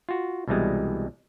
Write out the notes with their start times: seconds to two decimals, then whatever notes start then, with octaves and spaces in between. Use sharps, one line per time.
0.09 F4 F#4
0.48 C2 B2 E3 G3 G#3